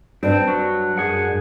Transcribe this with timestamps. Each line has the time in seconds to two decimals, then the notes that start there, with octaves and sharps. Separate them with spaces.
0.23 G2 C4
0.48 F#3
0.98 F#2 G#4 F#5